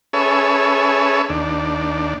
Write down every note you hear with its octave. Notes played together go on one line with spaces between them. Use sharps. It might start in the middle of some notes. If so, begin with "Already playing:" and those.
C#4 G#4 A4 B4 C#5 E5
D#2 D4